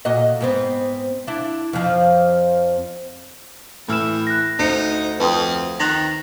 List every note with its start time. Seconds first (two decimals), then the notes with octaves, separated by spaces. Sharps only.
0.05 A#2 F#4 D#5
0.41 G#2 B3 C4
1.27 D4 E4
1.73 F2 F3
3.89 A2 E3 E4 E6 F6 E7
4.27 F#6 A#6
4.59 D2 D#4 C5 C#7
5.20 F2 B4 G5 D#6
5.80 D#3 F#6 A6 A#6